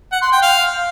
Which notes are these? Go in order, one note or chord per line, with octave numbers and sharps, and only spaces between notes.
F#5
C6
G5
F5